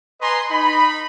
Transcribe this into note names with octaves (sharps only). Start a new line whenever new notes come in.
B4 D#5 G#5 A#5 C6
D#4 B5